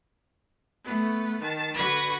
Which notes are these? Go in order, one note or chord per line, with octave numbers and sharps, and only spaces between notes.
A3 B3
D#3 A5
D3 F#4 B4 B5 G#6 A#6